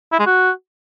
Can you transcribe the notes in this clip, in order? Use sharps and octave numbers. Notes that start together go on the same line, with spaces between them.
E4
G#3
F#4